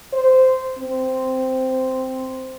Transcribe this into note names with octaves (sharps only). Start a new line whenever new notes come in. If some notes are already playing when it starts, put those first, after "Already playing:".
C5
C4